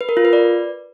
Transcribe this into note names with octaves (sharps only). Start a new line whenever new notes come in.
B4
A#4
F4
B4
D5